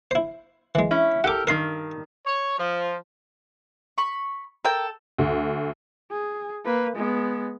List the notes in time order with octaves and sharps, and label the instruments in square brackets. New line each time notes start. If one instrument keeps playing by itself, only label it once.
[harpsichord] E4 C5
E3 G#3
[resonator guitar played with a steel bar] C#4 E4
[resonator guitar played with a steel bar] G4 A4 A#4 [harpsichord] F#5 D6
[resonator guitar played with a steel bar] G2 D#3 [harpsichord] A#4 C6
[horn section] C#5
F3
[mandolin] B5 C#6
[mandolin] A4 [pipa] A#4 G5
[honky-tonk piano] D2
[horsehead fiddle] G#4
A#3 B4
G#3 B3